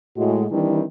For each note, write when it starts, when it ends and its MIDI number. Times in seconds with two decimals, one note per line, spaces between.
0.17 0.45 45
0.17 0.45 56
0.17 0.45 66
0.51 0.84 51
0.51 0.84 52
0.51 0.84 55
0.51 0.84 60
0.51 0.84 62
0.51 0.84 64